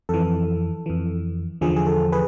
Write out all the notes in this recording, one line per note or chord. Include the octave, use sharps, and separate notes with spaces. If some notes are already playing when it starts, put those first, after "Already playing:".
F2 E3 A4
F2 E3
E2 D3 F3 G#4
G#4
A4
G#4 B4